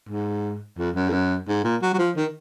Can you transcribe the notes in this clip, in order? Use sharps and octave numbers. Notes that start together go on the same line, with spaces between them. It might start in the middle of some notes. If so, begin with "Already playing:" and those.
G#2
F2
F#2
F2
F#2
G#2
A#2
F#3
F#3
F3
D#3